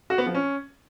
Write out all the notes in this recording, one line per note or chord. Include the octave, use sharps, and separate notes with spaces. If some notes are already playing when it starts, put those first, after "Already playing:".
F#4
B3
F3
C#4